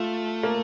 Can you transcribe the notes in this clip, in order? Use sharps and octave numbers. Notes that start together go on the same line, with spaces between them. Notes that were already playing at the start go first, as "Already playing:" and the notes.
Already playing: A3 F4
A#3